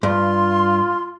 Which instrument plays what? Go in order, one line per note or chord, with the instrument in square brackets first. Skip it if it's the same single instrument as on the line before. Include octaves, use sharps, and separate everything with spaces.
[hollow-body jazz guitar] G2 [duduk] F4 [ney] C6